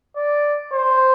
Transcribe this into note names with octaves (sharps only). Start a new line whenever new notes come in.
D5
C5